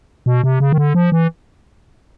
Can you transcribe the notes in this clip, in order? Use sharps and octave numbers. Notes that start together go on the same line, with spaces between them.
B2
C3
C#3
D#3
D3
F3
E3